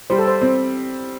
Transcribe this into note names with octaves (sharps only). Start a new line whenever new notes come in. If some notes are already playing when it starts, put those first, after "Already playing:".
G3 C5
A4
C5
C4